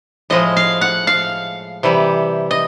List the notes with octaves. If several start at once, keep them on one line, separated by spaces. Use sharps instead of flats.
A2 F3 G#3 D#5
F5
F#5
F5
C3 E3 G3
D#5